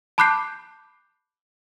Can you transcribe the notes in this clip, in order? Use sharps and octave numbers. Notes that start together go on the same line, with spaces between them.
A5 B5 D6 F#6 G6 C7